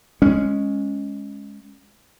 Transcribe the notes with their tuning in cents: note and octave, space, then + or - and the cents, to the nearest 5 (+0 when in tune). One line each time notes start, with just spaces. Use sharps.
G#3 +0 C#4 +0